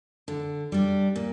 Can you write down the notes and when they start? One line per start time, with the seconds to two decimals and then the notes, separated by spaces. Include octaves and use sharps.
0.28 D3
0.72 G3 D4
1.16 A#2